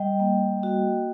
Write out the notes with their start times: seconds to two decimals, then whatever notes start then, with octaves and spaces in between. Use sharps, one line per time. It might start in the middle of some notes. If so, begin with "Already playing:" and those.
Already playing: G3 D#5 G5
0.20 A#3
0.63 F#4